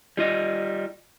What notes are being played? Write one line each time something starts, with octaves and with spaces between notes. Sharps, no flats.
G3 F4 D#5